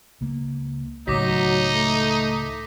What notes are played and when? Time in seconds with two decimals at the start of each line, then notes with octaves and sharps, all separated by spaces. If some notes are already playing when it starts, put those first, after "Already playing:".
0.21 C#2 A#3
1.08 C#2 A2 D#3 F#3 D#4 D6 A#6 B6
1.75 A3